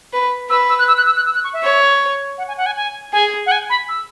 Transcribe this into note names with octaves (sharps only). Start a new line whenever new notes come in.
B4
B4 E6
E6
F#6
E6
F#6
E6
F#6
E6
F#6
C#6
E5
C#5
F#5
G#5
F#5
G#5
G#5
G#4 G#5
F#5
G#5
B5
E6